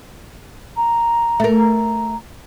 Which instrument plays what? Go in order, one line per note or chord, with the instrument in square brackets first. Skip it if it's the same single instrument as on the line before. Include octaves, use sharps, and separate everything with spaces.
[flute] A#5
[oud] A3 A#4
[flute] A#5